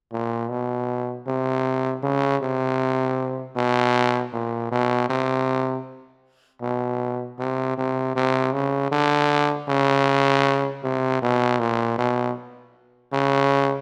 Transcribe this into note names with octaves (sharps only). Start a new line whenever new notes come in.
A#2
B2
C3
C#3
C3
B2
A#2
B2
C3
B2
C3
C3
C3
C#3
D3
C#3
C3
B2
A#2
B2
C#3